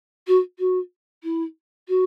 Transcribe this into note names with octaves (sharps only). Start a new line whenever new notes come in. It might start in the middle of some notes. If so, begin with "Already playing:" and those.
F#4
F#4
E4
F#4